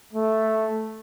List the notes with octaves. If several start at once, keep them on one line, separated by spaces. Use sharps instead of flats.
A3